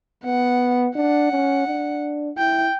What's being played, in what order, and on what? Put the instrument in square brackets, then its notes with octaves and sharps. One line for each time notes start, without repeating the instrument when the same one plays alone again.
[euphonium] B3 [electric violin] F#5
[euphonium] D4 [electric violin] F#5
[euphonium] C#4
D4
[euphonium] E4 [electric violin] G5